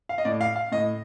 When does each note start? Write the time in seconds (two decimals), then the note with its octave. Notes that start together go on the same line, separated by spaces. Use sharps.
0.09 F5
0.18 D#5
0.25 A2 D5
0.41 F5
0.56 F5
0.72 A2 D#5